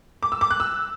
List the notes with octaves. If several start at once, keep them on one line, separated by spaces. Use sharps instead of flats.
D6
E6
D6
F#6
E6